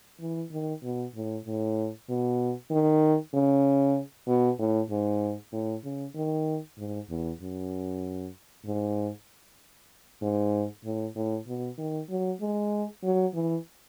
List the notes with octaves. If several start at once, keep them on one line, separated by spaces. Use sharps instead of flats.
E3
D#3
B2
A2
A2
B2
D#3
C#3
B2
A2
G#2
A2
C#3
D#3
G#2
E2
F#2
G#2
G#2
A2
A2
B2
D#3
F#3
G#3
F#3
E3